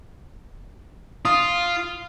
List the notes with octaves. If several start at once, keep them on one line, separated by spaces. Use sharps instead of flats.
F4 D#6